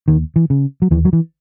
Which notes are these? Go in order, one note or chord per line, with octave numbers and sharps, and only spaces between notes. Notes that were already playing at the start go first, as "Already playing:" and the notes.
D#2 D#3
E3
C#3
F#3
D#2 E3
F#3
E3